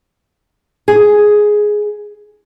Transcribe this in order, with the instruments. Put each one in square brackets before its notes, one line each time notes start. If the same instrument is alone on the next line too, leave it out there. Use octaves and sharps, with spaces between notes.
[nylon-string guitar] G#4